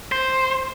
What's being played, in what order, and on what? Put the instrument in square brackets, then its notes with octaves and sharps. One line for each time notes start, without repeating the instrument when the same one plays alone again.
[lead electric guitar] C5